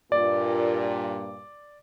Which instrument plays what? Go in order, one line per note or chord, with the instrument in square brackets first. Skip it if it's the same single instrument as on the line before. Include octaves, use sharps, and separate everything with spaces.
[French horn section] G2 A#2 [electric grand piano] D5